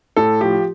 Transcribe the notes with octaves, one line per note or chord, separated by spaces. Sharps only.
A2 A4
F3 G4